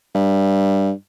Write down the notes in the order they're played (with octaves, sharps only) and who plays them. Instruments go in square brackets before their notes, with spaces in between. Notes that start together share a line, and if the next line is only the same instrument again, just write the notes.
[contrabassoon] G2